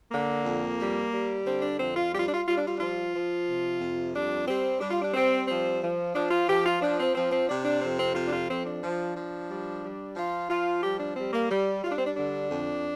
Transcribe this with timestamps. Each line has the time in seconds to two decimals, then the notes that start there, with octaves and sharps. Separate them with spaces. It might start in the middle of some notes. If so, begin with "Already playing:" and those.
0.12 D3 A#3
0.45 F2
0.80 G3
1.13 G3
1.46 D3 C4
1.62 D4
1.79 F2 C4
1.96 F4
2.14 G3 G4
2.20 F4
2.28 D4
2.34 F4
2.47 G3 F4
2.57 D4
2.68 F4
2.76 D4
2.80 F3 F4
3.13 F3
3.48 C3
3.80 F2
4.14 G3 D4
4.48 G3 C4
4.80 G3 D4
4.91 F4
5.02 D4
5.14 G3 C4
5.47 F3 C4
5.82 F3
6.14 F3 D4
6.31 F4
6.48 F3 G4
6.66 F4
6.81 F3 D4
6.99 C4
7.15 F3 C4
7.32 C4
7.49 C3 D4
7.65 D4
7.82 F2 C4
8.00 C4
8.15 C3 F4
8.28 D4
8.33 F4
8.49 F2 C4
8.66 D4
8.83 F3
9.17 F3
9.50 G3
9.83 G3
10.16 F3 F4
10.50 F3 F4
10.83 G3 G4
11.00 D4
11.17 G3 C4
11.33 A#3
11.51 G3
11.84 G3 F4
11.91 D4
11.99 C4
12.07 D4
12.17 D3 D4
12.51 F2